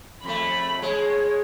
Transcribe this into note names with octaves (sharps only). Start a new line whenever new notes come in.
F2 A3 B5
G#3 C#5